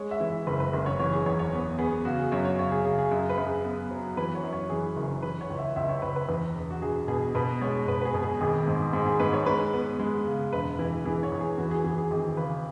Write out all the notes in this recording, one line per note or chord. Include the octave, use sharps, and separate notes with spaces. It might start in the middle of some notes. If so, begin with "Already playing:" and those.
Already playing: G#3 C#5
E5
E3
F#1 B4
B4
F#1
C#5
E3 C#5
G#4
E2 C#5
C#5
B3
B3 G#4
C#3 F#4
G#4
F#2 C#5
C#5
C#3 C#5
G#4
C#3 G#4
G#4
F#2 G#4
B4
F#2
G#4
B3
F#3
E3 B4
C#5
F#2
C#5
E3 G#4
F#1
E3 B4
C#5
C#2
E5
C#2 E5
C#5
C#2 B4
B4
E2 B4
E1
F#4
E1 G#4
B2 G#4
B2 B4
G#3 C#5
B2 B4
B4
G#4
B2
G#4
G#1 G#4
G#2
G#2 G#4
G#4
G#2 B4
C#5
G#3 B4
B3
G#3
C#3
E1 B4
E3
E3 G#4
C#5
E2
G#4
E3 F#4
G#4
E3 G#4
G#4
G#1 G#4
C#3 B4